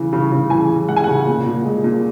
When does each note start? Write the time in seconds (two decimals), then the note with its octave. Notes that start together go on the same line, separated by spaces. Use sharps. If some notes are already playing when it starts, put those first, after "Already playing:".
Already playing: C#3 E3
0.13 C#3
0.32 C#3
0.50 E3 G#5
0.70 E3
0.88 G#3 F#5
0.96 G#5
1.04 C#3 F#5
1.27 A#2
1.46 A#2
1.65 G#3
1.84 A#2